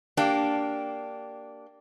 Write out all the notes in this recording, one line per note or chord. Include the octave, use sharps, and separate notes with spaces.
A#3 D4 G4